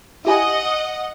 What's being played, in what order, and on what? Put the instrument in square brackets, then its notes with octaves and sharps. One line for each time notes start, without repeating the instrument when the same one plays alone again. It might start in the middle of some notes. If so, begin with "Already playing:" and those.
[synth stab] E4 G4 G#5 [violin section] D#5 F#5